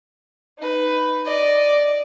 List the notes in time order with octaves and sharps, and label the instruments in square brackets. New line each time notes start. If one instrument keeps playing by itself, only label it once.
[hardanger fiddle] D#4 B4
D5 D#5